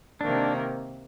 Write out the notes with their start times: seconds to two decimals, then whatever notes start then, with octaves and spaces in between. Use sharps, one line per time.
0.21 C3 D#3 A#3 D4